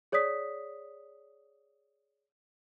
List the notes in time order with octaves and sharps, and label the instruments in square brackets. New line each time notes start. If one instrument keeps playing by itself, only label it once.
[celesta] G#4 C#5 D5 D#6 B6